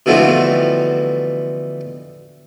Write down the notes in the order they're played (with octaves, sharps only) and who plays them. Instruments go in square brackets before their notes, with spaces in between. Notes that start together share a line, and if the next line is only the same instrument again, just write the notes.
[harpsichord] B2 D3 E3 F3 A3 C4